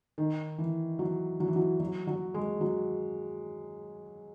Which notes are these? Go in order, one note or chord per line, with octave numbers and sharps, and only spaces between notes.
D#3
E3
F#3
F#3
E3
F#3
F#3
F#3
G#3
F#3